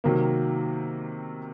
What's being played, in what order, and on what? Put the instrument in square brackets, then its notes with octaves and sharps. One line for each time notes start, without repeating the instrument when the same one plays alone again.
[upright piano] C3 D#3 F#3 A#3